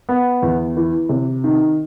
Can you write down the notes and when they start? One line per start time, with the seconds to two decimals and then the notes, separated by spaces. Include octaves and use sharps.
0.09 B3
0.43 E2
0.76 E3
1.09 C3
1.44 D#3